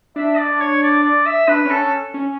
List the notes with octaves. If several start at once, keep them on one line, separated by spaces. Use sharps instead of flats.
D4 E5
D5
C#5
D5
D5
E5
D4 B4
C#4 A4
C#4
C#4